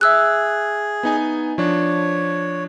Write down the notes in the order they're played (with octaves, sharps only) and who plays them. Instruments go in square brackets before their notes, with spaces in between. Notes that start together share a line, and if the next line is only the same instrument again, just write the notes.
[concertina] G#4 [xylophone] E5 E6 F#6
[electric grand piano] B3 D#4 G#5
[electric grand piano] F3 D4 [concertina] C#5